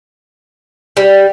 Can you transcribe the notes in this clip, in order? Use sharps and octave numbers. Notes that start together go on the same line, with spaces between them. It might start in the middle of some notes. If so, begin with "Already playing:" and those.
G3